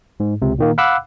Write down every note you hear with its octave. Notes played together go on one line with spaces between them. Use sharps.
G#2
C#2 C3
A#2 D#3 A#3
F5 F#5 B5 D6 E6 F#6